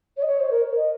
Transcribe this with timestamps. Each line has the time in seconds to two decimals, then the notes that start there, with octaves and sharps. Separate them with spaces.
0.17 C#5
0.22 D#5
0.27 C#5
0.39 C5
0.50 A#4
0.76 D#5